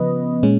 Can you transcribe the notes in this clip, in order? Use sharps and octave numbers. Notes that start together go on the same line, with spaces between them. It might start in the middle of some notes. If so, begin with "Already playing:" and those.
Already playing: C#3 F3 B3 B4 D#5
A#2 G#3 C#4